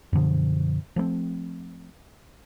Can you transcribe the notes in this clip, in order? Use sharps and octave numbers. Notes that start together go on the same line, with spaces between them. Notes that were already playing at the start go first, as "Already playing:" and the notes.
F#2 B2 D3 F3
F3 A3 B3 C4